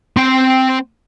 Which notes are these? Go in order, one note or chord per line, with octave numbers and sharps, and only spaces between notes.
C4 G5